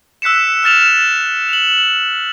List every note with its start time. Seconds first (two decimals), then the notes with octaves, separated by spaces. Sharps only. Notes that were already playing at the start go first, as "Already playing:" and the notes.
0.22 E6 F#6 B6 C#7 E7
0.63 E6 F6 A6 E7 F7
1.49 F7 F#7